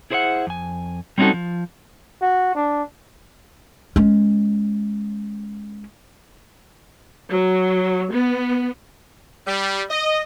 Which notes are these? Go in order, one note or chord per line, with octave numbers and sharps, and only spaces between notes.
E4 G#4 C5 C#5 E5 F#5
F2 G#5
G3 C4 C#4 D#4 F#4 A4
F3
F#4
D4
G#3 C#4
F#3
B3
G3
D#5